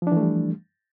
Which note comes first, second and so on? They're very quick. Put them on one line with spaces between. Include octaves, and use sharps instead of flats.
F3 D4 E3 A3 G3